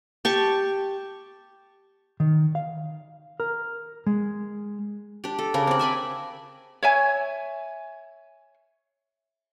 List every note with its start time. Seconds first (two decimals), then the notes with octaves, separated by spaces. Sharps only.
0.25 G4 A5 C#6
2.20 D#3
2.55 F5
3.40 A#4
4.07 G#3
5.24 D4 G4
5.39 A4
5.54 C#3 D4 A#4
5.67 C4 D5
5.79 E5 G#5 A5 B5
6.83 C#5 E5 G#5